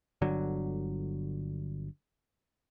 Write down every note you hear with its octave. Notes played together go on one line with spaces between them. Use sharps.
G1 D3 F#3